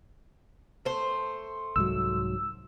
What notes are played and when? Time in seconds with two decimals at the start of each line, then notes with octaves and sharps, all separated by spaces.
0.85 A3 C5
1.76 C2 G#2 F#3 E6